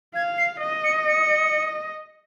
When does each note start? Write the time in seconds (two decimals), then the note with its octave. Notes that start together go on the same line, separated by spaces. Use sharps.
0.15 F5 G#6
0.38 C7
0.61 D#5
0.84 C#7
1.08 C#7